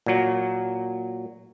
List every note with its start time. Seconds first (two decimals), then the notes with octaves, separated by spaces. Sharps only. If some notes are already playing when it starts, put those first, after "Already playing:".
0.06 A#2 F#3